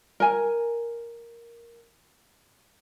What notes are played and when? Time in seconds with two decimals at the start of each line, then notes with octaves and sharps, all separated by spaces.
0.20 A#4 G#5